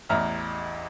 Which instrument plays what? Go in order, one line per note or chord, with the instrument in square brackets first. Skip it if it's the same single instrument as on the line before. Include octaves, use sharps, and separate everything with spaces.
[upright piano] A1 E2 E5 A#5 F6